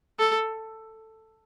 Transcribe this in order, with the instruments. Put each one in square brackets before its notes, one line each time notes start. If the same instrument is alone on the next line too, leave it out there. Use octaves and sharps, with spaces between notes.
[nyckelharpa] A4